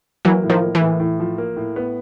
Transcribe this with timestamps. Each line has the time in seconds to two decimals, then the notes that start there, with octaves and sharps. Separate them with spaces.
0.25 E3 F#3 A#3
0.43 A2
0.50 D#3 F3
0.62 A#3
0.75 E3
0.81 A2
1.00 A2
1.20 F3
1.38 A#3
1.56 A2
1.76 B3